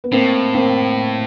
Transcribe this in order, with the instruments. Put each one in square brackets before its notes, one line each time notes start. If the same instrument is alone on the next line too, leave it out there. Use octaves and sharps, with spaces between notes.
[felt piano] B3
[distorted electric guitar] A2 [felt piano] A#3 C4
[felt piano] A#3 C4